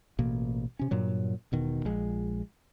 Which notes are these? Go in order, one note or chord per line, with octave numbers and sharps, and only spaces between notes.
A1 B2 A#3
C3 C#4
G2 A#2 F#3
E1 B2 D#3
A#1 F3 G#3